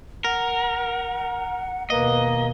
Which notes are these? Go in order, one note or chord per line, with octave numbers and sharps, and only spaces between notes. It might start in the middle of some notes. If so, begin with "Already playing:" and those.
A#4 F#5
D#2 B2 A#3 B4 D#5